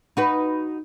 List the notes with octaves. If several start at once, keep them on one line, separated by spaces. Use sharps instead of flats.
D#4 F#4 B4